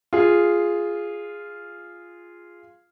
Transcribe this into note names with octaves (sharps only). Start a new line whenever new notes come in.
F4 G#4